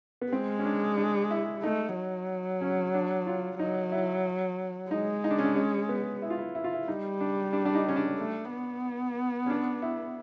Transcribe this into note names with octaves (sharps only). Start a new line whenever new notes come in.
B3
G#3 C4
C#4
D4
D4
E4
A3 D#4
F#3
C#4
D4
F4
F#3 D#4
E4
G#3 D#4
D#4
D4
C#4
D4
C#4
B3
E4
F4
E4
E4
F4
E4
G3 D#4
D4
D4
D4
D#4
C#4
D4
A3
B3
C#4
D4
E4